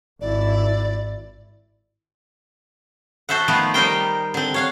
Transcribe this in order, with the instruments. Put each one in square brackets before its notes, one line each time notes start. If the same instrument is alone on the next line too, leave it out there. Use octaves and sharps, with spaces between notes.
[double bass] G#1 E4 [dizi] D5
[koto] F#4 A4 C5 E5 F#5
D#3 F3 A3 B3
G3 D#4 G4 A#4 C5 G5
D3 C4
C#5 F5 F#5